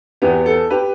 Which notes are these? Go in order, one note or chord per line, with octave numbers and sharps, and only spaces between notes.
E2 E3 B3 G4
A4
G4 B4